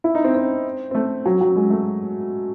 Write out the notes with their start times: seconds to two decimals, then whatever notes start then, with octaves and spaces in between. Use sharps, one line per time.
0.04 E4
0.15 D#4
0.24 C4
0.35 C4
0.91 C4
0.95 A3
1.26 F#3
1.41 F#3
1.56 G#3
1.70 A3